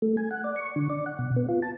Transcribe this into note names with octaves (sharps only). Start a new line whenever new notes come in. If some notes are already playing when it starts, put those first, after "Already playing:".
A3
G#5
F#5
D5
C#6
D3
D5
F#5
B2
B3
F4
A5